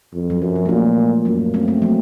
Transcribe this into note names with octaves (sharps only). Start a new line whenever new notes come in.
F2
F#3
F#2 F3
F#3
A#3
A#2 A3
F#2 F#3 A#3
A3 C4
A3 C4
F#3 A#3